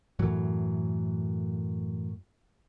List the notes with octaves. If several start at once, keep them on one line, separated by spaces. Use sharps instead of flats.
F#2 A2 E3 F#3